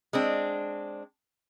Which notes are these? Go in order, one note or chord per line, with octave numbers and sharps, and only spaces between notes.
G#3 C4 D4